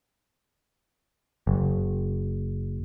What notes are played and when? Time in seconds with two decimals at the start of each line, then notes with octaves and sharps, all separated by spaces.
1.47 F#1